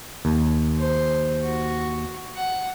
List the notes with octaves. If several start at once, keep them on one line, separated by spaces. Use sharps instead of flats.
D#2
C5
F#4
F#5